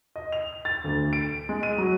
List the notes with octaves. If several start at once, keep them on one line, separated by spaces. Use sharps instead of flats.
D#5
F7
A6
D2
D7
G#3
D#7
F#3